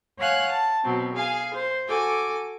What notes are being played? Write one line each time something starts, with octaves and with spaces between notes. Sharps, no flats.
C#5 F5 F#5 G#5 F#6
A5
B2 F#3 C4
G#4 F5 G#5
C5
F#4 A4 G#5 D6